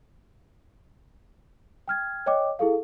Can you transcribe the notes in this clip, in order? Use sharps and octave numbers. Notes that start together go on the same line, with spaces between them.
G5 F6 G#6
C#5 D#5 G5 D6
E4 G#4 A4 F5